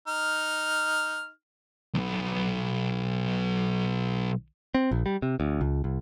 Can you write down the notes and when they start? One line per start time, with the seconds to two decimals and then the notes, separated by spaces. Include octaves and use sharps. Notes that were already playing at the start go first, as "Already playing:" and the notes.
0.07 D#4 F6
1.95 B1 E2
4.75 C4
4.91 A#1
5.06 G3
5.22 C3
5.40 D2
5.61 C#2
5.84 C2